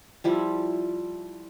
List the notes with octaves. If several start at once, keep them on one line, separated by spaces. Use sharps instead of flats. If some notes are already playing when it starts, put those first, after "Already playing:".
F3 G3 E4